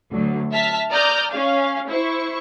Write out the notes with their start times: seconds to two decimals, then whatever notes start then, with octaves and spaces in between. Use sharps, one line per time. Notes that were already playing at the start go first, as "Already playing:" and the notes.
0.10 D2 F#3
0.52 E5 A5 F6 B6
0.90 D5 A#5 D#6 F6 G6
1.30 C#4 F5
1.88 E4 C5 C#6